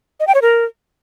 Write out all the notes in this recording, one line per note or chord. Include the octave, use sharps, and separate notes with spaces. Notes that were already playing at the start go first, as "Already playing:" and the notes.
D#5
G5
C#5
A#4